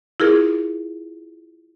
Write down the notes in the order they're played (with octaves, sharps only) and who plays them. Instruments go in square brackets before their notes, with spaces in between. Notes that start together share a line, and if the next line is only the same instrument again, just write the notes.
[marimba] E4 F4 G#4 A#4